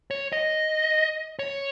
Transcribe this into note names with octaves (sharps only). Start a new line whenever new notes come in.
C#5
D#5
C#5